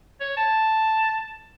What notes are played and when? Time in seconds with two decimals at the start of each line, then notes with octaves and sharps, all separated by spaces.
0.21 C#5
0.37 A5